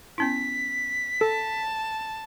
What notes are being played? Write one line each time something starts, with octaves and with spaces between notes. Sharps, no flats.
B3 C#4 E4 B6
A4 A5